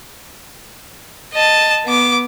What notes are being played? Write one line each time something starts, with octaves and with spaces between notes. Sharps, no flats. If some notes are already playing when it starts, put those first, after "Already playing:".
D#5 A5
B3 D6